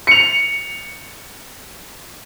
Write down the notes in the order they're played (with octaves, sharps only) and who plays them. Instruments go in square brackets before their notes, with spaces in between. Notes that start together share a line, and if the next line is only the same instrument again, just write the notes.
[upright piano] C#7 F7